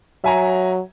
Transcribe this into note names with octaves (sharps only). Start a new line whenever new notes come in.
F#3 E5 G#5 A#5